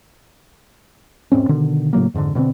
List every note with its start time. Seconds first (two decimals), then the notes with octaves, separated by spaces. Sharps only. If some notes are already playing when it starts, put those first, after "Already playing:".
1.32 E1 G#2 C4 C#4
1.49 B2 D3 D#3
1.93 A2 C#3 F#3 A#3
2.14 F2 G#2 B2 D3
2.35 B2 D3 A#3 C4